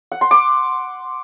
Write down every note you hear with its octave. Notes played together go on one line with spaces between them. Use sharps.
F#5
C6
D6